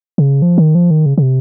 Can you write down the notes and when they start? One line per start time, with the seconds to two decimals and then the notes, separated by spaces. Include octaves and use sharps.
0.18 C#3
0.42 F3
0.58 D#3
0.75 F3
0.91 D#3
1.06 C#3
1.18 C#3
1.22 C3